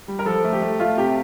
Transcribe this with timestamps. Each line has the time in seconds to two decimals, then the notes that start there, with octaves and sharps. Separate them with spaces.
0.08 G3
0.19 A#4
0.25 F3 A4
0.44 A3
0.53 G4
0.62 A3
0.80 A3 F4
0.97 C3 G4